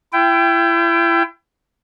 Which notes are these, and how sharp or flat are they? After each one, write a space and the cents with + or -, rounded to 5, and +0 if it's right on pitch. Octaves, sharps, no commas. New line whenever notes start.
E4 +35 G5 +0